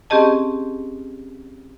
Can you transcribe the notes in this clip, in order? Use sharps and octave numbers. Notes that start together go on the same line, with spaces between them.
C4 C#4 G4 G#4 D#5 A5